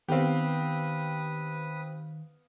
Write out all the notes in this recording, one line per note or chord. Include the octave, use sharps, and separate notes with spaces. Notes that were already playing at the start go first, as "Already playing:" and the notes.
D#3 B3 C4 G4 B4 F5 D#6